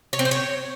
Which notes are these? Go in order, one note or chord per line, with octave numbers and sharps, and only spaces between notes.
C#5
C4
C5
C#5